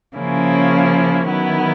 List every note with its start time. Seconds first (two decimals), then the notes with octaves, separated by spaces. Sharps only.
0.17 C#3 F3 A#3 C#4 E4
1.28 D#3 F#3 B3 E4